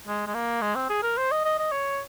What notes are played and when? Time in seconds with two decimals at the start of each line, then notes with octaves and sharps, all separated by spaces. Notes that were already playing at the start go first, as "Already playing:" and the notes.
0.07 G#3
0.27 G#3
0.34 A#3
0.62 G#3
0.75 C4
0.89 G#4
1.03 A#4
1.17 C5
1.31 D#5
1.44 D#5
1.59 D#5
1.72 C#5